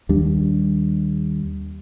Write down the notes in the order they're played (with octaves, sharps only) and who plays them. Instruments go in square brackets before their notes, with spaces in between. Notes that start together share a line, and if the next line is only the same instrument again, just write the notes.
[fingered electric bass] D#2 G3 D4